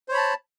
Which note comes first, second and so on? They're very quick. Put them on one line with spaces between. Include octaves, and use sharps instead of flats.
C5 C#5 B5 A5